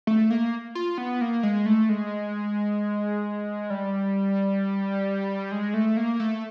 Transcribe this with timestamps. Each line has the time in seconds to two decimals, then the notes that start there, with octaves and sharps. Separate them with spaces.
0.07 A3
0.30 A#3
0.75 F4
0.98 B3
1.21 A#3
1.43 G#3
1.66 A3
1.89 G#3
3.70 G3
5.52 G#3
5.74 A3
5.97 A#3
6.20 A3